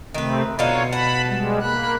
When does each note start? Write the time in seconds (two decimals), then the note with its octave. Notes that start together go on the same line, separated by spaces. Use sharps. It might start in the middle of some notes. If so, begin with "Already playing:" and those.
0.14 C3 D#3 A3 C4 B4
0.59 B2 D3 D#4 F4 C#5
0.93 F#5 A5 B5
1.27 G3 G#3
1.62 A#3 B5 F#6